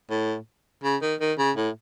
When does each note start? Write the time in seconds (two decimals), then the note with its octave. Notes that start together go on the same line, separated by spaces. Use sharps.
0.10 A2
0.83 C#3
1.02 D#3
1.20 D#3
1.38 C#3
1.56 A2